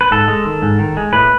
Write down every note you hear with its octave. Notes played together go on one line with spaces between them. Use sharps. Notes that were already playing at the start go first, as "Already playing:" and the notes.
B4
G#2 A4
G#3
D#3
G#2
D#3
G#3
A2 B4